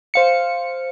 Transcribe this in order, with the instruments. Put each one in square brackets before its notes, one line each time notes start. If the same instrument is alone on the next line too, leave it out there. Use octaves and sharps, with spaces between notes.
[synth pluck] C5 F5 C#7